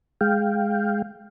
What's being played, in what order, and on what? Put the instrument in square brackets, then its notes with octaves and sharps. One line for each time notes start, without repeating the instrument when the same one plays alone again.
[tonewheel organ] G#3 F5 G5